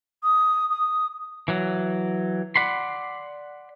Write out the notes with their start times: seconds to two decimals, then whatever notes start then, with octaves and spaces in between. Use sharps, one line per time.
0.23 D#6
0.70 D#6
1.48 E3 F#3
2.56 D5 F#5 B5 C6